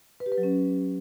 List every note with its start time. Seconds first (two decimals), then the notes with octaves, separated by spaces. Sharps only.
0.20 B4
0.26 G4
0.32 B4
0.38 F#3
0.43 C#4